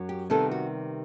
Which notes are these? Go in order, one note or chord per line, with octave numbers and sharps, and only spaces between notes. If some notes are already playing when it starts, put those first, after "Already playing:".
Already playing: F#2 F#3
G4
C3 D#3 G3 B3 A4
F#4